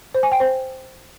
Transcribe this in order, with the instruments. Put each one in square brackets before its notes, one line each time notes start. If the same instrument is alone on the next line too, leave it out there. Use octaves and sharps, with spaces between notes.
[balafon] C5
G#5
G5
C5